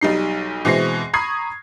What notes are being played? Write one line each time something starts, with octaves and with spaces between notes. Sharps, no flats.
B1 G3 D#4 C7
B2 E3 G#3 C4 A#6 C7
A#5 B5 C#6 D#6 G#6 C7